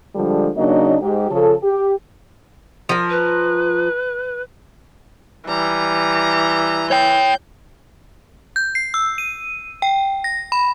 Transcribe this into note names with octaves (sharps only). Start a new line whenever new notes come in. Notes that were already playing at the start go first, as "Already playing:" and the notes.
D3 F3 G3 G#3 D4 A4
C#3 F#3 A#3 D4 D#4 D#5
G#2 G4
C#3 F3 A4
G4
F3 A#4
B4
E3 G3 A#5
C#5 G5 G6
G6
C7
E6
D#7
G5
A#6
B5